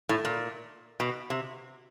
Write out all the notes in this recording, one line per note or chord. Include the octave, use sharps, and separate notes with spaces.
A2
A#2
B2
C3